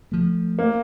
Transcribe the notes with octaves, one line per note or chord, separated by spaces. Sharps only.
F3 A3
A#3